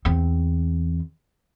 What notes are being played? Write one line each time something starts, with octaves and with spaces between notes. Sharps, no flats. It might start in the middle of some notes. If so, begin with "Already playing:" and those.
E2 C4